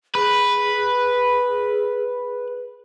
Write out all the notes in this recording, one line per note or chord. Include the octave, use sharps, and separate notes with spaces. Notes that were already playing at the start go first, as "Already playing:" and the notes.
G#4 B4